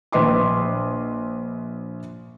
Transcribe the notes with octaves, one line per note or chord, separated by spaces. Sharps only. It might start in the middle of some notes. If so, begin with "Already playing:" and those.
A#1 B4 D#5 C6 D6